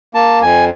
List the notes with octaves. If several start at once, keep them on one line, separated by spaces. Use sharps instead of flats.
A#3 A5
F2 G#5